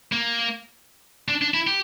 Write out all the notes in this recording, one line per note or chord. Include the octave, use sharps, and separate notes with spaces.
A#3
D4
D4
E4
G4